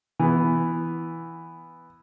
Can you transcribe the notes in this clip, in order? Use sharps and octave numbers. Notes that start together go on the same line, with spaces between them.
E3 B3